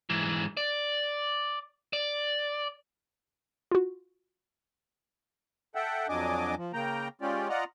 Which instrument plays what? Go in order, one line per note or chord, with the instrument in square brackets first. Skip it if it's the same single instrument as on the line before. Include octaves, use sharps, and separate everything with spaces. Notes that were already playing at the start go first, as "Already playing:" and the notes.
[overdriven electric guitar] G#2 E3
D5
D5
[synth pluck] F4 F#4
[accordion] A4 E5 F#5 G5
F2 F#3 D4 D#5 G#5 D6
F3
C#3 A#3 G5 A#5
G#3 C#4 F4 G4 D5
F4 D5 D#5 F#5 A#5